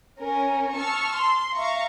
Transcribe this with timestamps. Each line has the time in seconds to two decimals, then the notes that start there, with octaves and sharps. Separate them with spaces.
0.19 C#4 A#4
0.74 A5 C#6 E6 F6
1.16 C6
1.56 E5 F5 A#5 C#6